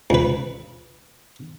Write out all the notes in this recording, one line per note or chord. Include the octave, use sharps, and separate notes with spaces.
C#2 B4